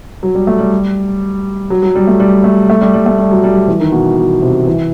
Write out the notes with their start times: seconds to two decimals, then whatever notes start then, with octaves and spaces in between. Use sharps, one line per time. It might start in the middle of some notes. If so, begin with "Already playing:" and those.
0.23 F#3
0.35 G3
0.47 A3
0.59 G3
1.70 F#3
1.82 F#3
1.95 G3
2.07 A3
2.20 G3
2.44 A3
2.70 A3
2.81 G3
2.94 G3
3.06 A3
3.18 G3
3.31 F#3
3.44 G3
3.56 F#3
3.68 E3
3.80 D#3
3.92 B2
4.17 B2
4.42 C3
4.67 E3